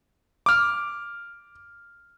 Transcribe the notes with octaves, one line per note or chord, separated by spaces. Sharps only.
D6 F6